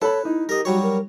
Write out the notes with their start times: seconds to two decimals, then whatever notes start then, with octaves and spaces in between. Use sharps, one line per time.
0.02 A4 B4 C#5 B5
0.25 D#4 E4
0.49 G4 A#4 D#5
0.65 F#3 G3 F#4 C#5
0.83 A#4